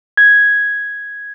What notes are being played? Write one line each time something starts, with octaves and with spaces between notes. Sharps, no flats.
G#6